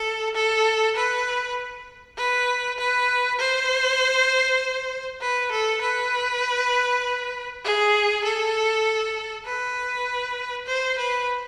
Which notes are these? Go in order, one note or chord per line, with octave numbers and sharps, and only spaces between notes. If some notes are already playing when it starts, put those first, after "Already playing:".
Already playing: A4
A4
B4
B4
B4
C5
B4
A4
B4
G#4
A4
B4
C5
B4